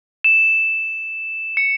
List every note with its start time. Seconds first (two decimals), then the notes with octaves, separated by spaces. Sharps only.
0.24 E7
1.57 C#7